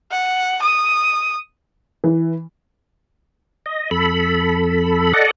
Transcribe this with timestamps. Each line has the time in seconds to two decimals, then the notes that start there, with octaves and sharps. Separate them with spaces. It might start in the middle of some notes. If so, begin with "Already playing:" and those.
0.11 F#5
0.62 D#6
2.04 E3
3.66 D#5
3.91 F2 A4 B5
5.13 A4 D5 D#5 F#5